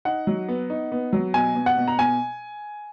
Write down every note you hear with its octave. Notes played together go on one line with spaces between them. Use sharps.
D#4 F#5
F#3
B3
D#4
B3
F#3
B2 G#5
B2
F#5
B2
A#5
B2 G#5